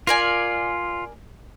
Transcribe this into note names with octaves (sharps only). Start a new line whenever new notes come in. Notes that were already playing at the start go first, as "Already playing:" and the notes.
F4 A#4 D5 G#5